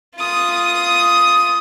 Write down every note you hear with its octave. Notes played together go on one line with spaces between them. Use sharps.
F4 D#6